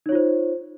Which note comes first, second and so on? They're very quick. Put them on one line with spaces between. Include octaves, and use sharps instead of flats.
D#4 C#5 F4 C5